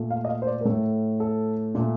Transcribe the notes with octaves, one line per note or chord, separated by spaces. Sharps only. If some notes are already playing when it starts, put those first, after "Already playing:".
Already playing: A#2 A3
F5
D#5
F5
C5
D5
A#4
A2 A3 A4
A4
A#2 A3